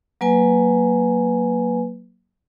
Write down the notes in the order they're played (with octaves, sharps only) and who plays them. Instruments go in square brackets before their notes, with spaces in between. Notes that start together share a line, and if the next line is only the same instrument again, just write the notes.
[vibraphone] F#3 A#3 B4 G#5